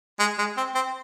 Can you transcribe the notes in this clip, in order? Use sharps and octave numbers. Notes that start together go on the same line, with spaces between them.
G#3
G#3
C4
C4